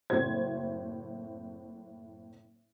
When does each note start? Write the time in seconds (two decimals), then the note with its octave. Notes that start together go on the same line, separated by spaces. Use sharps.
0.10 F#1 A2 C4 F#4 C5 G#6